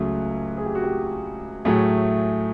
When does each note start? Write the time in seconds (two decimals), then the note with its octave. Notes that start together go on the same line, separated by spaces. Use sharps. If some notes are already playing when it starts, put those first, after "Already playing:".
Already playing: C#2 C#3 F#3 A3 G#4
0.57 G#4
0.66 G4
0.75 F#4
0.84 G4
1.65 A2 F#3 A3 G#4